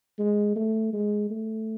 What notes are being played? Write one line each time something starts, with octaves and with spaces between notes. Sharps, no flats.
G#3
A3
G#3
A3